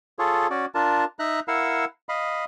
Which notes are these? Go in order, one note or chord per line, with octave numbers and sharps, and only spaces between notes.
F4 G#4 A4 C#5
C#4 F#4 D5
D4 F4 A#4 A5
D#4 E5 A#5 F#6
E4 A#4 F5 F#5 E6
D#5 F5 B5